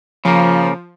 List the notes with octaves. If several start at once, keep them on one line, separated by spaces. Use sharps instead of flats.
C#3 F3 A#3